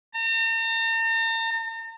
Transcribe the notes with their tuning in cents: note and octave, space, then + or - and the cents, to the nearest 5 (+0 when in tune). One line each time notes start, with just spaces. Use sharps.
A#5 -45